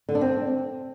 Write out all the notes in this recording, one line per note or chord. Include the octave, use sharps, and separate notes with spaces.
D3
D4
C4